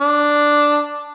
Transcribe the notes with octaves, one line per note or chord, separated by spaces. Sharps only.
D4